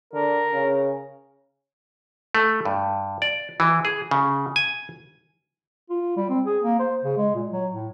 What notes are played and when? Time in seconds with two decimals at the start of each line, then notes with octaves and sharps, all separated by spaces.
0.14 D3 A#4
0.53 C#3
2.35 A3
2.65 G2
3.22 D5
3.60 E3
3.85 G#4
4.11 C#3
4.56 G#5
5.90 F4
6.17 G3
6.29 C4
6.46 G#4
6.62 A#3
6.80 C5
7.04 C#3
7.18 G#3
7.35 A#2
7.51 F#3
7.72 A2